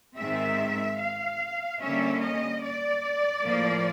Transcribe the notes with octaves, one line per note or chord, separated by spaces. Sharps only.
G#2 D#3 G#3 C4 E5
F5
D3 G3 A#3 C#4 E5
D#5
D5
A2 F3 A#3